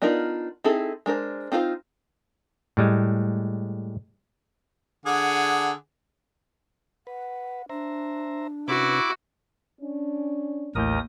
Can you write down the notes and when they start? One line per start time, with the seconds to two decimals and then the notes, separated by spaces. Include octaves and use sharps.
0.02 B3 D4 D#4 F4 A#4
0.64 C4 D#4 E4 G#4 A4
1.06 G#3 D4 A#4 C5
1.52 C4 D#4 F4 B4 C5
2.77 A2 G3 G#3
5.06 D3 G#4 F#5
7.07 B4 F#5
7.69 D4 C5 E5 A#5
8.68 C3 C#4 E4 F#4 B4 D6
9.81 C#4 D4
10.75 A1 D#2 A2 A#4 D#6 G6